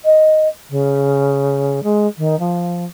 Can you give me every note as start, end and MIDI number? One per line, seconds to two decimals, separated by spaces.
0.05 0.48 75
0.70 1.80 49
1.83 2.07 56
2.18 2.38 51
2.39 2.85 53